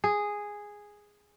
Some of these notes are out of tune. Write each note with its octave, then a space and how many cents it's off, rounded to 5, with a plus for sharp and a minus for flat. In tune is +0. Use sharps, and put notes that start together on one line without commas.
G#4 -5